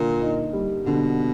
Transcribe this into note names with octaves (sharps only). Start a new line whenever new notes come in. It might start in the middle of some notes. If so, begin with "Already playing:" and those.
Already playing: A#2 D3 A#3
D#4
G3
B2 D3